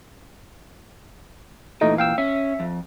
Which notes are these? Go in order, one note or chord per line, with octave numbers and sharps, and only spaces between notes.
A#2 E3 A3 D#4 D#5
F5 G5 E6
C#4 E5
F2